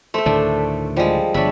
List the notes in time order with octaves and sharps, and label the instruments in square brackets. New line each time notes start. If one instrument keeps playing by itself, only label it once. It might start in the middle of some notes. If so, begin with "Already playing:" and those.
[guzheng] A3 [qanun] C5 E5
[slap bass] D2 A2 D#3 [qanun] D4
[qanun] F3 [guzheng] G3 G#3
[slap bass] G1 F3 [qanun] D4 C#5 E5 [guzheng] B5